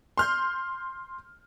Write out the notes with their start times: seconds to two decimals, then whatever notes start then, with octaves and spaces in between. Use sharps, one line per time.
0.18 C6 F6 G6